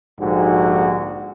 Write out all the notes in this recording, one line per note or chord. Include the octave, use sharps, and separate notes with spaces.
A#1 G#2 D3 F#4 G4